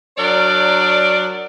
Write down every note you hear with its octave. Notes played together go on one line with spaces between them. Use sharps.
F#3 D4 A#4 C#5 D5